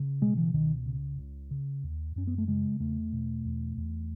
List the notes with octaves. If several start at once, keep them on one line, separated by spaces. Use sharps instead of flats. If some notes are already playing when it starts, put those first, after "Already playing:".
Already playing: C#3
B2 G#3
E3
C#2 D#3
C#3
C#2
C#3
D#2
F#2 C#4
B3
A3
C#3 G#3
E2 A3
B2
E2
E2